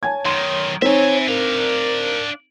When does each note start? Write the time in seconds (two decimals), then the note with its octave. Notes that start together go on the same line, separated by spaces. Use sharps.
0.03 C#5 G#5 A5 G#6
0.25 B1 D#3 C6
0.82 C4 D#4 C#5 E5 G#5
1.28 D4 A#4 F5